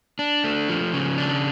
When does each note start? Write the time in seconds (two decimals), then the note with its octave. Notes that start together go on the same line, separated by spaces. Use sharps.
0.19 D4
0.44 A3
0.69 F3
0.93 C#3
1.18 D4